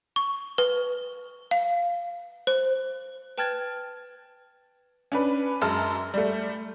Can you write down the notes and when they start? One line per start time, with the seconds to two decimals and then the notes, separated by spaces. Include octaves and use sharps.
0.16 C#6
0.58 B4
1.51 F5
2.47 C5
3.38 B4 G5 A5 F6 G#6 A6
5.12 C#4 D4 B4
5.61 F#2 G#3 A5 F6
6.14 G3 A3